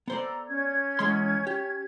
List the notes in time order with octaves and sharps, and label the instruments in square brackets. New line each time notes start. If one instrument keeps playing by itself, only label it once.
[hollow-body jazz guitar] B3 C5 D5 [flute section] A4 A#5
[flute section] C#4 G#6
[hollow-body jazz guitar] E2 G#3 C6
G4